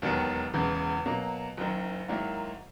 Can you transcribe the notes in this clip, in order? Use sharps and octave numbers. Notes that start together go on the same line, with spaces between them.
E1 D#2 D#3 F#3 B3
E1 E2 C#3 E3
B2 F#3 A#3
F#1 F#2 D#3
G#2 D#3 F#3 A#3 E4